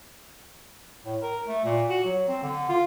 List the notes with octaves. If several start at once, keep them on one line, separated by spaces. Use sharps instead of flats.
A2
A#4
A3
A#2
F#4
F#3
C4
D3
F4